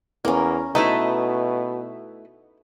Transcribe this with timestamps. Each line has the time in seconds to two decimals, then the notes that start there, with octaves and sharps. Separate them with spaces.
0.25 E2 A#3 C#4 A#4
0.75 B2 A3 D#4 E4 B4 A5